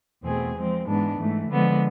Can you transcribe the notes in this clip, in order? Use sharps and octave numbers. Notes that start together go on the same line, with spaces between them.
E2 B2 A3 C4 G#4
F3 G#3 C4
G#2 E3 G#3 B3 D4
G#2 E3 A3
D3 F3 G#3 B3